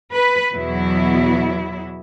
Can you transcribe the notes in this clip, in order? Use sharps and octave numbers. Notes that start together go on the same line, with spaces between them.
B4
E2 B2 F#3 B3 E4